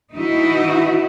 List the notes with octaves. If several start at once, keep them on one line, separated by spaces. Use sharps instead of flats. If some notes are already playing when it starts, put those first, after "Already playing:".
E3 D#4 E4 F#4